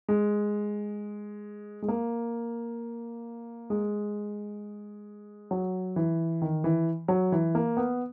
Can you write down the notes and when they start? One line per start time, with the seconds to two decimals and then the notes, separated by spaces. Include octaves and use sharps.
0.08 G#3
1.82 G#3
1.88 A#3
3.70 G#3
5.51 F#3
5.96 E3
6.42 D#3
6.64 E3
7.08 F#3
7.32 E3
7.55 A#3
7.77 B3